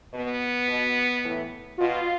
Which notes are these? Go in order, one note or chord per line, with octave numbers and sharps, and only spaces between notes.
B2 B3
B2
A2 E3
B2 F4